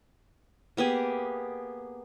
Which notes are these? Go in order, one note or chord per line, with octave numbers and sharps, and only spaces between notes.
A#3 B3 G4 G#4